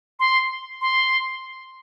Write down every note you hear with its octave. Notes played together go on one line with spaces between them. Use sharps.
C6
C6